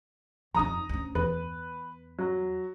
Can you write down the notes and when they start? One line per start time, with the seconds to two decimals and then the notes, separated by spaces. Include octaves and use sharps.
0.54 F2 D#4 A#5 D#6
0.89 D2 C#4
1.15 E2 B4
2.19 F#3